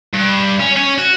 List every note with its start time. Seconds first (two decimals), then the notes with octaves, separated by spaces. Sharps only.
0.13 G2
0.60 C#4
0.77 C#4
0.98 F#4